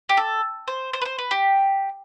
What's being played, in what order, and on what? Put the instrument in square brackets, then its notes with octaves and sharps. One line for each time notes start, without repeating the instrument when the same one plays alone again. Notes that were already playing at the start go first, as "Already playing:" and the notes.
[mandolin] G4
A4
C5
C5
B4
C5
B4
G4